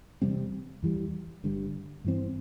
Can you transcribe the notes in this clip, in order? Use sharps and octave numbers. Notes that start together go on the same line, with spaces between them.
E2 C3 G3 C4
E2 E3 G3
G1 G2 D3 G3
G2 E3 C4